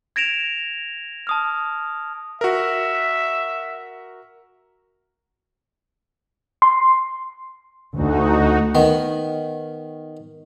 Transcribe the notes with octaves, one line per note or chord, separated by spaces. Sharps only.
G#6 A#6 D7 E7 F7
A5 D#6 F6
F#4 A#4 E5
C6
D2 D#4 F#4
D#3 B3